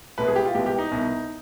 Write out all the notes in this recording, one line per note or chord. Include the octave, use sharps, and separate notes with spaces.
C2 B2 G#3 B3 B4
G#4
G4
F4
C2 B2 G#3 B3 G4
G4
D#4
C2 B2 B3